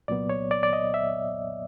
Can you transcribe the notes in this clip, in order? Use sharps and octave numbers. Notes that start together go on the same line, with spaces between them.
C2 A#2 F#3 B3 D5
C#5
D5
D5
D#5
E5